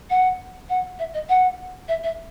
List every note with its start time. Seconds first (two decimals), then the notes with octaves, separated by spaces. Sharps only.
0.10 F#5
0.69 F#5
0.99 E5
1.14 D#5
1.29 F#5
1.88 E5
2.03 E5